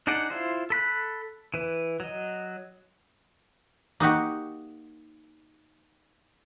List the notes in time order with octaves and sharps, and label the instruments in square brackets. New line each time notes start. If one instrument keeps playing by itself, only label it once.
[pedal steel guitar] D4 D#4 G#4 D5 F#5
E4 F4 C5
A4 B5 F#6
E3 B4
F#3 D#5
[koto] A#3 D#4 F#4 G4